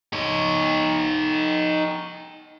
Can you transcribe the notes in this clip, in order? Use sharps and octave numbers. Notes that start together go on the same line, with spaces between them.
D#4 C#5